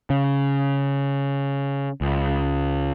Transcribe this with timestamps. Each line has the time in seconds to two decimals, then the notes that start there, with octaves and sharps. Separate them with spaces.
0.10 C#3
2.01 C#2